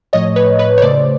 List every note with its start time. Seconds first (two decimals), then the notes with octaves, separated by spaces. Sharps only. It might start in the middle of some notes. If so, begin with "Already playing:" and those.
0.13 A2 F3 A3 C#5 D#5
0.36 B4 C#5
0.59 B4 C#5
0.78 C#5
0.82 C#3 F#3 A3 C5 D5